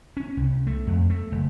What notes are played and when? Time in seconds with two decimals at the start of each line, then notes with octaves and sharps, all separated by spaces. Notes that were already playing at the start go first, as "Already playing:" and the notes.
0.17 C#4
0.37 C2
0.67 A3
0.87 F2
1.10 A3
1.32 F#1